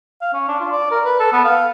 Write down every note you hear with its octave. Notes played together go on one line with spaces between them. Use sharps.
F5
C#4
D4
F4
D5
A#4
B4
A4
B3
F5